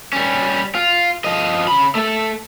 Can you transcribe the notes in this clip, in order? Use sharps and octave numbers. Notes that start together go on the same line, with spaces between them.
G3 C#4
F4
F3 D#5
C#3 B5
A3 A4